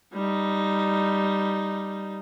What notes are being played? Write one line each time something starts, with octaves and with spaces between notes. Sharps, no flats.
G3 D#4